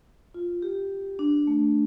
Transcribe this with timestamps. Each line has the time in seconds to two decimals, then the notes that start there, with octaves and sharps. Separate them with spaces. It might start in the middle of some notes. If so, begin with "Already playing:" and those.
0.34 F4
0.62 G4
1.19 D4
1.47 A3